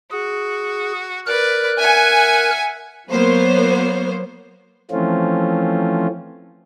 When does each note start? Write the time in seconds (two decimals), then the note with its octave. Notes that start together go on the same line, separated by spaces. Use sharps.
0.11 F#4 G#4
1.27 A#4 B4 D5 F#6
1.79 E5 F#5 G#5
3.09 F#3 A#3 B3 C5 C#5
4.91 E3 F3 A3 C4 C#4 F4